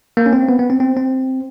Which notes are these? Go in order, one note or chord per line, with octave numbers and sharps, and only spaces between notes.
A#3
C#4
C4
B3
B3
C4
C4
C4